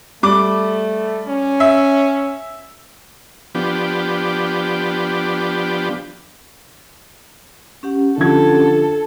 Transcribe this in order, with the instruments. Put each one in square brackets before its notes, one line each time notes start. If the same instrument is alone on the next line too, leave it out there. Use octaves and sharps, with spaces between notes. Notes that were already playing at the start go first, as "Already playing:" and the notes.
[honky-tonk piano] G3 D6 [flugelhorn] A3
[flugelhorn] C#4
[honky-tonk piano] E5
[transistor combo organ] F3 B3 D4 G4
[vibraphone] C#4 G4 F#5
[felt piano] D3 F3 G#6 [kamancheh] A4